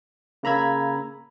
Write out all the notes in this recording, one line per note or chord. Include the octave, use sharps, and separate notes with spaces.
C#3 A#3 A#5 B5 E6 G#6